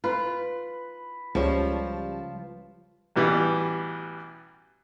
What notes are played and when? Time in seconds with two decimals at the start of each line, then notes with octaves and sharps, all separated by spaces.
0.04 F4 B4
1.35 C#2 F3 G3 C#5 A5
3.16 A1 B2 E3 G3